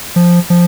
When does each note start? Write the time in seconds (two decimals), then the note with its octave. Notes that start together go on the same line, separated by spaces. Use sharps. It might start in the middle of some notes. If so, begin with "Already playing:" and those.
0.16 F3
0.50 F3